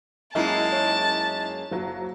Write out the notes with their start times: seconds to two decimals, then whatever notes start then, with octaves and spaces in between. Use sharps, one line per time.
0.35 F#2 G#3 A#3 D#4 E4 A5
0.73 C#5
1.71 F#1 F#3